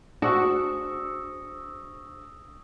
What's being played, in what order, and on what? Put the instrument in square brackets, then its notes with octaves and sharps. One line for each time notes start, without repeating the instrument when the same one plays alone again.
[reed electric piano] D4 G#4 C5 [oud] F#4 [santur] E5 C#6 [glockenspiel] D#6 A#6